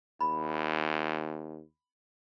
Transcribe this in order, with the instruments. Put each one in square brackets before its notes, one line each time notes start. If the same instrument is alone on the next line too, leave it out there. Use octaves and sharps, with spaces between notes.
[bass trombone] D#2 [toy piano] B5